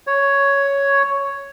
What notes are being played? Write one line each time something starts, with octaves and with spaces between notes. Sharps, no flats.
C#5